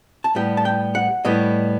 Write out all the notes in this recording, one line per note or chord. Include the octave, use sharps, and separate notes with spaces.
A5
A2 G3 B3 G5
A5
G5
F#5
A2 G3 B3 D#5